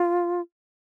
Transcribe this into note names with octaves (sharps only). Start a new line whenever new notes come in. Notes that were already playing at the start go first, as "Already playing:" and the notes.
Already playing: F4